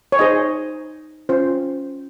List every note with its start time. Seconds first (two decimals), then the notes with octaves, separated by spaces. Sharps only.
0.12 C#5
0.19 D#4 G#4 C5 D#5
1.29 C#4 F4 C5